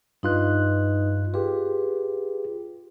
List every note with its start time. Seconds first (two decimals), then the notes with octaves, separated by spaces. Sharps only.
0.23 G2 D#4 F4 B4 D#5 F#6
1.34 F4 G4 G#4 B4